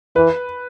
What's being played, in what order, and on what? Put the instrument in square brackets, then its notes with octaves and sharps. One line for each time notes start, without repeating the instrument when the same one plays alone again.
[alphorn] E3 [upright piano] B4